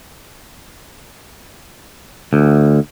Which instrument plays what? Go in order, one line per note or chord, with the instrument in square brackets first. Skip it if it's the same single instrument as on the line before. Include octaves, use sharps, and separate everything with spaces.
[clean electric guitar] D2